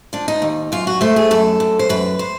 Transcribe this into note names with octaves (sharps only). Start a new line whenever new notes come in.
F3 D4
D#4
D#2
F#2 F4
F#4
A3 C5
G#4
F#2 A4
F#2
C5
F#2 B4
C5